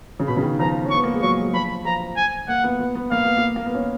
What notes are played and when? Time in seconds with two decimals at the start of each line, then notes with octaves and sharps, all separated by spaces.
0.20 C#3
0.28 B2 B5
0.37 C#3
0.43 D#3
0.59 F3 A#5
0.85 C#4
0.90 B3 C#6
1.04 A#3
1.13 G#3
1.22 F#3 C#6
1.38 G#3
1.53 F3 B5
1.85 F3 A#5
2.17 G#5
2.48 A#3 F#5
2.64 B3
2.80 B3
2.95 B3
3.12 A#3 F5
3.24 B3
3.37 A#3
3.56 A#3
3.66 B3
3.74 C#4